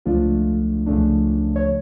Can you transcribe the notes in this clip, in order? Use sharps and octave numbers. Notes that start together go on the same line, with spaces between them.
C#2 C#3 F3 A3 D4 F4
C#2 C#3 F3 A3 D4
C#5